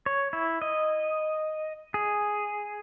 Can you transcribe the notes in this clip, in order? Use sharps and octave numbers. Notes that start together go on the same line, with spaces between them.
C#5
E4
D#5
G#4